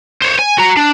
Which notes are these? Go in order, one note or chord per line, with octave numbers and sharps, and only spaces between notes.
C5 C#5
G#5
F#4 A#5
D4